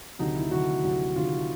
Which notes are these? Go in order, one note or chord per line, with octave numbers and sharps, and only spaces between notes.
D2 C3 D#3 F#3 D#4
E4
D2 C3 D#3 F#3 F#4
D2 C3 D#3 F#3
D2 C3 D#3 F#3 F4